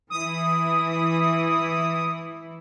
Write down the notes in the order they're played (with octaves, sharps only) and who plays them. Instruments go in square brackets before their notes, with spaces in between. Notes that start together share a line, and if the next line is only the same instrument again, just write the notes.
[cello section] E3 E4 [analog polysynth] D#6